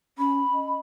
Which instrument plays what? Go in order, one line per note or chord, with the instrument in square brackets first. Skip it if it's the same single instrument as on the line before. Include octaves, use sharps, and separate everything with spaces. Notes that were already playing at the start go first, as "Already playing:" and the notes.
[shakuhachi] C#4 [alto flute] B5
[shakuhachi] D#5